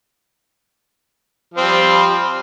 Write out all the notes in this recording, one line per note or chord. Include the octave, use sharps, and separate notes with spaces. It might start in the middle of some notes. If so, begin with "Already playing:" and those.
F3 G3 C4